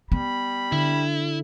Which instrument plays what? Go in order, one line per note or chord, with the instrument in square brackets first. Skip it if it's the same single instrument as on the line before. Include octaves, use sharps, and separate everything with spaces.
[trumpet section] G3 B5 [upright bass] B3
[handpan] D3 [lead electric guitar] E4